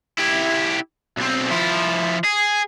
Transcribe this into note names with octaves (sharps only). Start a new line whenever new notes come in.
E4 G4
B1 C4
F3 E4
G#4